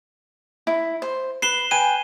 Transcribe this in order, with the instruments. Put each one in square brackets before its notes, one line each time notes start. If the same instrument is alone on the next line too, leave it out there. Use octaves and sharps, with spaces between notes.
[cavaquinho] E4
C5
[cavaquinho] B4 [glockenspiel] C7 E7 G7
[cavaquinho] B4 G5 G#5 [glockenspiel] D#7